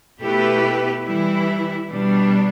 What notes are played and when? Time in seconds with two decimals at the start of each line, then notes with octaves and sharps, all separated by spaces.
0.21 B2 A3 E4 G4 B4
1.04 E3 G3 E4
1.89 B2 G3 D4